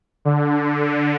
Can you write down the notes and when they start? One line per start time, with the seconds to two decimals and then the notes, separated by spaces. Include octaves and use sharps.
0.25 D3
0.86 D3